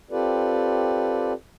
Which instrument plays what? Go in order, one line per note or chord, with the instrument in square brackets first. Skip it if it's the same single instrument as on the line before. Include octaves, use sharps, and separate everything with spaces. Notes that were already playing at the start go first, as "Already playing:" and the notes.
[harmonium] C4 F4 G4 A4 B4 D5